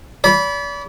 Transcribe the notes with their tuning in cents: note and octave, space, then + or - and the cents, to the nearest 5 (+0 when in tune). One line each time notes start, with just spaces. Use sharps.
D5 -40 B5 -10